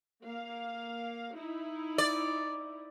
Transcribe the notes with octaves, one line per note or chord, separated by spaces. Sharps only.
A#3 F5
D#4 E4
D5